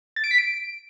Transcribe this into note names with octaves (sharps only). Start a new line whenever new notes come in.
A6
D7
B6
D7